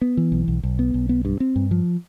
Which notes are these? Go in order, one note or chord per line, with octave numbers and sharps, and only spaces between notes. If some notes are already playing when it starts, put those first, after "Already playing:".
B3
E3
B1
B1
B1
B3
B1
B3
G2
C4
G2
F3